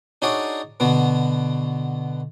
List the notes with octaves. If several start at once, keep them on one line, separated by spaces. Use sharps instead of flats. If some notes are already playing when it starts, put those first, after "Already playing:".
D4 D#4 F#4 G#4 C#5 D5
B2 D3 B3 F#4